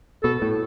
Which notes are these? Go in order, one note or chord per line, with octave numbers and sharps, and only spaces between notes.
B2 A4
A2